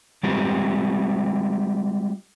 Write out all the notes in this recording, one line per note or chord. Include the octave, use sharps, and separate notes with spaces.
G3 G#3 C4 F4 G4 B4